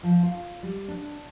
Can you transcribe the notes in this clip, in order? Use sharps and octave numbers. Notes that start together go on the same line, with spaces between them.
F3
F4
G3
D4